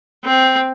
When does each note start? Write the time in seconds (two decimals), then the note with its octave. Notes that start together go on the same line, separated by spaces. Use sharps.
0.24 C4